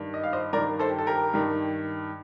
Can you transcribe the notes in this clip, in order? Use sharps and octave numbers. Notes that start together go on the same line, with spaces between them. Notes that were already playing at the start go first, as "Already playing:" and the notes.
Already playing: G2 D#3
D#5
F5
C5 D#5
G2 D#3 A#4 D5
A4 C5
G4
A4
G4 A#4
G2 D#3